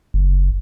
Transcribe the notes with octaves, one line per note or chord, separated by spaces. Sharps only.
F#1